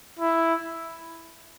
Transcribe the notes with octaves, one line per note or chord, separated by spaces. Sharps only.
E4